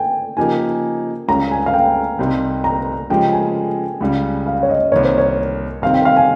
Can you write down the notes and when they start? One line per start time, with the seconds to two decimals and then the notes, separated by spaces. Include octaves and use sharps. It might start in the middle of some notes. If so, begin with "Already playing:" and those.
Already playing: G5 G#5
0.37 C#3 F3 A#3 D#4 G4 G#5
1.28 C#2 C#3 G3 C#4 A#5
1.51 G#5
1.66 F5
1.74 G5
2.18 C2 C3 G3 C4 D#4
2.64 A#5
3.10 C#3 F3 G#3 C#4 G4 G5
3.33 G#5
4.00 C#2 C#3 G3
4.47 F5
4.63 C#5
4.69 D#5
4.92 C2 C3 D#3 A#3 C#5
5.05 C5
5.18 C#5
5.82 C3 D#3 G3 C4 F5
5.94 G5
6.05 F5
6.16 G#5